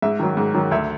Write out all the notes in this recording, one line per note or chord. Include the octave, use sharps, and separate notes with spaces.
G#2 E5
D#3 F#3
G#2
D#3 F#3
D2 E5